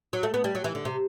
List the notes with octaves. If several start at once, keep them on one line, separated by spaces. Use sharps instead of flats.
F#3
A3
B3
G3
F#3
E3
D3
C3